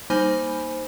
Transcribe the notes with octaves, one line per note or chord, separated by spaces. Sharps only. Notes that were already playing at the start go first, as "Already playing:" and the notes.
G3 A#3 D#4 C5 G#5 B5